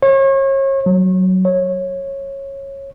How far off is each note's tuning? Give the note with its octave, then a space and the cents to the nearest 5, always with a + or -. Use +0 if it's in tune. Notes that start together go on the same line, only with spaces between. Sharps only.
C#5 -35
F#3 +10
C#5 -15